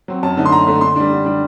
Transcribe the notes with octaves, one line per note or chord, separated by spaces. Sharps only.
F#3 C4
F#2 A5
D3 A3 D#4
C6
F#2 A#5
D3 A3 D#4
D3 C6
G3 D4
D3
G3 D4